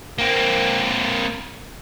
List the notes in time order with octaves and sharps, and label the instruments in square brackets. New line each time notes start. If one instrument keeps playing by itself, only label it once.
[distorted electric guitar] A#3 C4